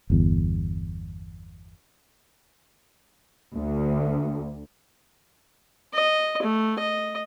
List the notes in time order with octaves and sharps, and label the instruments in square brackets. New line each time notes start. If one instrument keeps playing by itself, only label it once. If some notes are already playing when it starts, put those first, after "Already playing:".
[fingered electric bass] G1 E2
[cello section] D2
[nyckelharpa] D#5
A3
D#5